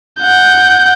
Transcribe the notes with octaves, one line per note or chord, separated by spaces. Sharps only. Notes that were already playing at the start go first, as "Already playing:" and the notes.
F#5 G6